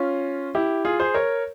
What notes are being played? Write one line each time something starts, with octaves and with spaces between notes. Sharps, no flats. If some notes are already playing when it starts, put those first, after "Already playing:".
Already playing: C#4 F4
E4 G4
F4 G#4
G#4 C5
A#4 C#5